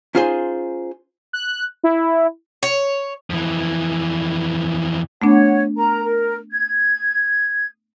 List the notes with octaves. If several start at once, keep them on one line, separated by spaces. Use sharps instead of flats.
C#4 D#4 F4 G#4 C5 G#5
F#6
E4
C#5
F2 E3
A3 B3 D4 C#5 F#5
A#4 A#5
A#4
G#6